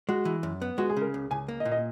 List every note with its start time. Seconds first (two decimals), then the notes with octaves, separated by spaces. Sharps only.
0.09 G#3 F#4
0.25 E3
0.43 F#2
0.62 B3
0.78 G#3 F#4
0.90 G#4
0.97 C#3 A#4
1.14 C#2
1.31 C#2 G#5
1.48 A#3
1.60 D#5
1.65 A#2
1.72 D#5